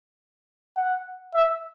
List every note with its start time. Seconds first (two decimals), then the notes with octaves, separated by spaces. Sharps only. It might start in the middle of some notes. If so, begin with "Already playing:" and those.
0.76 F#5
1.34 E5